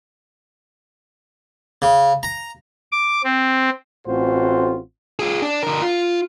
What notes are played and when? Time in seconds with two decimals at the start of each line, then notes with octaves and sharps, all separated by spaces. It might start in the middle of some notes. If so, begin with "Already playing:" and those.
1.82 C#3
2.23 A#5
2.92 D6
3.24 C4
4.07 A1 A2 C4 F4 F#4 C5
5.19 F4 G#4
5.42 D4
5.63 D3 A#4
5.82 F4